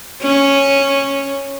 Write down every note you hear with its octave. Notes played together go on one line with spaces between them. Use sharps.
C#4